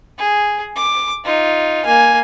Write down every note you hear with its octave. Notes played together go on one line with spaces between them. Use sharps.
G#4
D6
D#4 F4
A#3 G#5